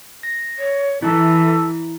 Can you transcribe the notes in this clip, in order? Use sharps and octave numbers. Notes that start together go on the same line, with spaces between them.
A#6
C#5
E3 E4 A4